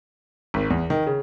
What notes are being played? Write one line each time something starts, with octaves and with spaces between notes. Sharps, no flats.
G#1
E2
D#3
C#3